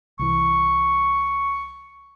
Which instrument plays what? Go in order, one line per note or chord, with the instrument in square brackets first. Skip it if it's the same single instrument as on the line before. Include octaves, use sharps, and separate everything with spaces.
[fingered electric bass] C2 E3 [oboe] C#6